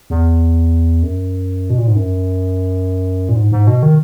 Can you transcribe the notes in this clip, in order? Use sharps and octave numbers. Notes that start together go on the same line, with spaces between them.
E2
F#2
B2
A#2
G#2
F#2
A#2
G#2
G#2
B2
D#3